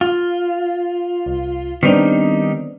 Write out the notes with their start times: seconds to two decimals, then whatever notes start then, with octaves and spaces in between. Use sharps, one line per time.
0.01 F4
1.26 C2
1.83 D#3 G3 B3 C4 D4 D#4